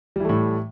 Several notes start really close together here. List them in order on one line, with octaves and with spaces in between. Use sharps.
G3 E3 A3 A2